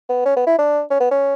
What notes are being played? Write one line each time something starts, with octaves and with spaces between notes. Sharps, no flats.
B3
C#4
B3
E4
D4
C#4
B3
C#4